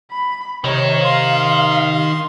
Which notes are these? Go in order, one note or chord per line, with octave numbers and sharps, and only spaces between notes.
B5
C3 D#3 D#4 C#5
F5 C6